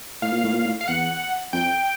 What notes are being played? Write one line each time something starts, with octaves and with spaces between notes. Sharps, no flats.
A2 F5
A#2
A2
A#2
A2
F5
E2 F#5
F2 G5